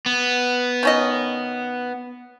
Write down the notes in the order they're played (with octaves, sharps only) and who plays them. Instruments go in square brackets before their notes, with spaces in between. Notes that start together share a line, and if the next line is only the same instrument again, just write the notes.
[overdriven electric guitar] B3
[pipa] D#3 C#4 D#5